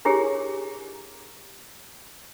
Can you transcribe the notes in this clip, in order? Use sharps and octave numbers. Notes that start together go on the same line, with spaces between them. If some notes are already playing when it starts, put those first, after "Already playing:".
D4 E4 G4 G#4 A#4 C#5